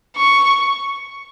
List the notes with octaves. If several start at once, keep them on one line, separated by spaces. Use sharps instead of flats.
C#6